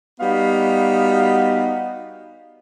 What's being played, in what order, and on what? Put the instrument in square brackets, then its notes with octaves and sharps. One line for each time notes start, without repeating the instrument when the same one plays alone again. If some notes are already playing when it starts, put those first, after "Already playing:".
[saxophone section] G3 B3 D#4 F#4 F5